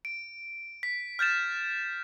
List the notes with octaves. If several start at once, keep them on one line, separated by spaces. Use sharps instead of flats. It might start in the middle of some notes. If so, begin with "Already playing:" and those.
D7
B6
F6 G6 A6 E7